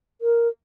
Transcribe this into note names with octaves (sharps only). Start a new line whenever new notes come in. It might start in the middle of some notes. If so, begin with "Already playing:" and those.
A#4